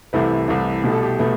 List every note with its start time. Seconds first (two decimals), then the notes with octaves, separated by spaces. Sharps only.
0.13 C2 C3 E3 A3 B4
0.48 C2 C3 E3 A3
0.83 C2 B2 A3 G4
0.93 A4
1.03 G4
1.19 B2 A3 B4